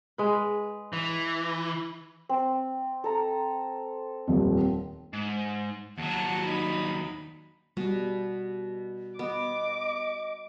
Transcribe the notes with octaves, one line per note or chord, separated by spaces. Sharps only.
G#3 B4
E3
C4
A4 A#5
D#1 F2
G#2
D#2 F#3 F#5 A5
D#4 B5
B2 G3
B3 D#5 D6